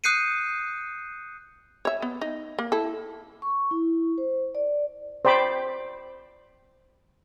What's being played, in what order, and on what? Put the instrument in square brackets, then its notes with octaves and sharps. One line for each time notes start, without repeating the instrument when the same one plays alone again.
[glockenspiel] D#6 F#6 G6 C7 C#7 D#7
[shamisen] C#5 E5
B3
D#4
A#3
E4 A4
[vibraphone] C#6
E4
C5
D5
[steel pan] C5 D5 G5 B5 D6